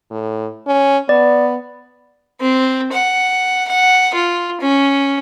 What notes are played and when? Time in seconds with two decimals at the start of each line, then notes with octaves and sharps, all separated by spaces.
0.11 A2
0.67 C#4
1.09 B3 D5
2.40 C4
2.93 F#5
3.68 F#5
4.15 F4
4.61 C#4